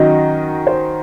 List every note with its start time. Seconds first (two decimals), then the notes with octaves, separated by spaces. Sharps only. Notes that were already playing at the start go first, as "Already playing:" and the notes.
Already playing: D#3 F#3 C#4 F#4 D#5
0.67 C5